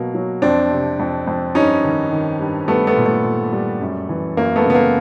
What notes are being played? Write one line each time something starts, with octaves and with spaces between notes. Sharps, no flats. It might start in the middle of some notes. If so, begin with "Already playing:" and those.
Already playing: B2 F#3 A#3
F#3
F2 C4 D4
C3
F2
F2
G2 C#4 D#4
D#3
D#3
G2
G3 A3 B3
A3 B3
A#2
A3
A#2
G3
F#2
E3
F#2 A#3
A3 B3
C#3 B3
A#3